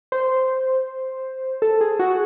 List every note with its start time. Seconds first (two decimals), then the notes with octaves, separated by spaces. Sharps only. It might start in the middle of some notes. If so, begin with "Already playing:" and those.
0.12 C5
1.62 A4
1.81 G#4
1.99 F#4